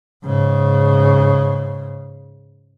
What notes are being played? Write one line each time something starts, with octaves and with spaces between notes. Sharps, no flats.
G#2 C#3